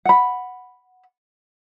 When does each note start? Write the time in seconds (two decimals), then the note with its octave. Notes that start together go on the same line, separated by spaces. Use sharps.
0.05 F#5 B5